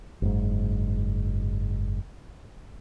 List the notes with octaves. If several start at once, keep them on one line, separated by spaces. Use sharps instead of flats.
F#1 G#2